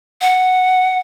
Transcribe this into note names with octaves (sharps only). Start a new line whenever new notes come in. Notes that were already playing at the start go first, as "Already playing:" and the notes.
F#5